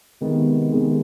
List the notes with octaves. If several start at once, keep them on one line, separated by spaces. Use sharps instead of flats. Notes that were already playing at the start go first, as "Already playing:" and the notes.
C3 D#3 G#3 B3
C3 D#3 G#3 B3